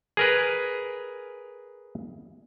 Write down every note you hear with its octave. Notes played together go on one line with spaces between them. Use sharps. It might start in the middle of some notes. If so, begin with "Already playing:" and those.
G#4 A#4 B4